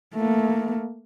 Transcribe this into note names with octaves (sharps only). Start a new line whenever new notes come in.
A3 A#3